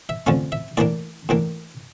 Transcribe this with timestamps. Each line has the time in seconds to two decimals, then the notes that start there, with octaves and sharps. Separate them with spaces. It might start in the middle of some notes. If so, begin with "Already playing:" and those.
0.09 E5
0.26 F2 D3 A3 C#4 F5
0.52 E5
0.77 A2 E3 A#3 D4 D5
1.29 A2 E3 A#3 D4